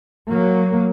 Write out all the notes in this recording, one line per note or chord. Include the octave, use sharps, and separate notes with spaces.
F#3 A#3